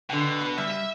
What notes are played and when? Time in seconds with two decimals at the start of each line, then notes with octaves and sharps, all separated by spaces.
0.10 B2 D3 G5
0.41 B3 B4
0.58 G3 E5
0.71 E5